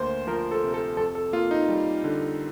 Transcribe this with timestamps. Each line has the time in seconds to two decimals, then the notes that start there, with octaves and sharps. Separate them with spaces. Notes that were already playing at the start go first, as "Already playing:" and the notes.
Already playing: D2 A#3 C5
0.27 F3 A#4
0.51 A4
0.63 C3
0.74 A4
0.97 F2 A4
1.15 A4
1.33 A#3 F4
1.51 D#4
1.69 G3
2.04 D3